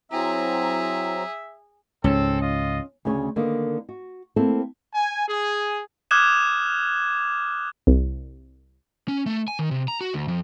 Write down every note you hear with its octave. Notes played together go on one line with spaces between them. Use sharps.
F#3 C4 E4 G#4 E5 A#5
C#2 G#2 C4 C#4 A4
F4 D#5
D2 C#3 C#4 C#5
D3 D#3 A#3 B3
F#4
A#3 C4 E4 A4
G#5
G#4
D6 D#6 F6 F#6 G#6 E7
C2
C#4
A3
G#5
D#3
C3
A#5
F#4
D2
F2